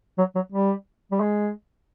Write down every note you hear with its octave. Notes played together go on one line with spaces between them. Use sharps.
F#3
F#3
G3
G3
G#3